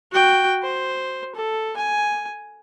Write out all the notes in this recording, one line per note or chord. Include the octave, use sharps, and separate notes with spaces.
F#4 G5
C5
A4
G#5